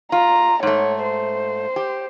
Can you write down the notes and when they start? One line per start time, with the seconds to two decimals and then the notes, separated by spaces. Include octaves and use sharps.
0.12 F4 A#5
0.63 G#2 A3 C#5
1.03 C5
1.76 G4